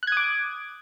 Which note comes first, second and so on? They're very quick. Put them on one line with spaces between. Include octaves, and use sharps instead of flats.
F#6 G#6 D#6 D6